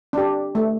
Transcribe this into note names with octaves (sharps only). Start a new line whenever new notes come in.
D4 G4
A3